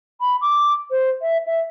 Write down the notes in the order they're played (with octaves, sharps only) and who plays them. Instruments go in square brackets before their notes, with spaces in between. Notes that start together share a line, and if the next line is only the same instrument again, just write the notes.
[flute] B5
D6
C5
E5
E5